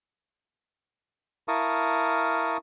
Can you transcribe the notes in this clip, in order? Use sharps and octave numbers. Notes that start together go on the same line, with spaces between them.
E4 A#4 F5 A5 C#6 D#6